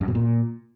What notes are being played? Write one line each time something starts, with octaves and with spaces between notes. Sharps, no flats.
F#2
B2
A#2